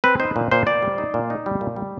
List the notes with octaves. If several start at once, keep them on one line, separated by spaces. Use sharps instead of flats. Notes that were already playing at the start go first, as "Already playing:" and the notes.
C4 B4
D#4 C5
A#2
A#2 C5
A#2 D5
G3
D#4
A#2
D#4
G3
A#2
G3